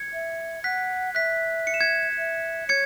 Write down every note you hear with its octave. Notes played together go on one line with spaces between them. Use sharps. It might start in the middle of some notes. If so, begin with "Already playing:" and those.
Already playing: G#6 C#7
E5
F#5 F#6 B6
E5 F#6 B6
C#7
E7
G#6 C#7
E5
C#5 G#6 C#7